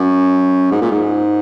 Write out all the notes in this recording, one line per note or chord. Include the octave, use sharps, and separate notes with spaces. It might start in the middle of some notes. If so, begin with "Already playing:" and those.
Already playing: F#2
G#2
A#2
G#2